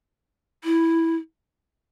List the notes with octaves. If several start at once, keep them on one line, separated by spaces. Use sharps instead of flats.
E4